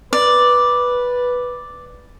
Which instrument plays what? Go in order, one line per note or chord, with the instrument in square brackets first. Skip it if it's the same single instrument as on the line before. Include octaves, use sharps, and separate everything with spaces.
[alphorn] B4 [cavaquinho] D5